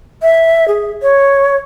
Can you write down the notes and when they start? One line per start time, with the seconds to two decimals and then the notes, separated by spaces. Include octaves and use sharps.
0.22 E5
0.68 G#4
1.02 C#5